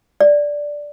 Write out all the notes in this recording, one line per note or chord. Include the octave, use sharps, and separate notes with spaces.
D5